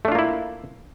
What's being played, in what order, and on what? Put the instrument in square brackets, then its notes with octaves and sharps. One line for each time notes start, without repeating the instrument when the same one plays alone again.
[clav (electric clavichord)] A3
D4
F4
A#3
E4